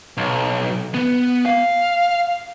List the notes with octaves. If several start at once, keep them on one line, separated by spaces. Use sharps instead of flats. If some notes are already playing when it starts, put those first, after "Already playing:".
B1
B3
F5